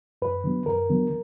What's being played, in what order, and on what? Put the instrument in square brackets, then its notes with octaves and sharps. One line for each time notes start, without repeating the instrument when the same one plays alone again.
[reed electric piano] F#2 B4
D3 F#3 B3
F#2 A#4
D3 F#3 B3